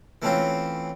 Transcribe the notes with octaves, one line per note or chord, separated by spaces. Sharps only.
E3 A3 C4 C#4 F4